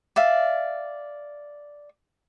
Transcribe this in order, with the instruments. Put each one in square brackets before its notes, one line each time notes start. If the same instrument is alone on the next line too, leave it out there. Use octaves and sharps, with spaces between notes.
[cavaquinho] D5 E5 F5